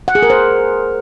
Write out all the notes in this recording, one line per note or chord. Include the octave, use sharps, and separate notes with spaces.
F#5
G#4
A#4
C5